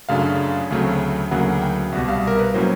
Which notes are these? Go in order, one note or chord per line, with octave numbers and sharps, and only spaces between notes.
F#2 C#3 F#3 A3 D4 F5
D2 C#3 F#3 A3 C4
D2 C#3 F#3 A#3 F#5
G5
C2 B2 G3 F#5
F5
A#4
B4
A2 F#3 A#3 C#4 E4 C5